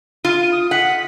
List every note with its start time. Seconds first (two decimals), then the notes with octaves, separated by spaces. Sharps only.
0.25 F4 D#7
0.52 D#6
0.71 F#5 B6